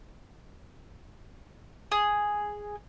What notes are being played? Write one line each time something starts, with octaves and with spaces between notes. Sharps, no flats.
G#4